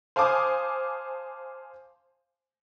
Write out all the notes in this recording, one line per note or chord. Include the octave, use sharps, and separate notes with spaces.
C5 F5 G#5 A5 D6 D#6